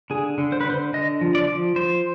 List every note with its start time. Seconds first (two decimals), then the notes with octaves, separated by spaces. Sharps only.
0.10 D3 G#4
0.38 D3
0.52 C5
0.61 B4
0.65 D3 C5
0.93 D3 D#5
1.21 F3
1.35 D5
1.49 F3
1.76 F3 C5